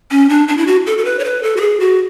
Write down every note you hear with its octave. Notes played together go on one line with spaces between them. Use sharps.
C#4
D4
D4
E4
F#4
A4
A4
B4
C#5
B4
A4
F#4
G#4
F#4